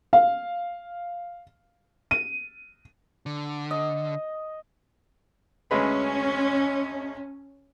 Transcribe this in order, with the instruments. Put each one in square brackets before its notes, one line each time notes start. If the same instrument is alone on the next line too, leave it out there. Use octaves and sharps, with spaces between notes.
[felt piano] F5
D#7
[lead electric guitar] D3
[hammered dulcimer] D#5
[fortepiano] D2 G#3 B4 [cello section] C#4